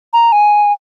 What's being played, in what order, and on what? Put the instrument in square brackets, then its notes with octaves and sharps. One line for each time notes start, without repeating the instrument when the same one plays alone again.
[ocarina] A#5
G#5